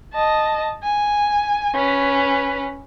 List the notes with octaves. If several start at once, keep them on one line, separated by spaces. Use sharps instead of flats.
D#5 A5
G#5
C#4 B4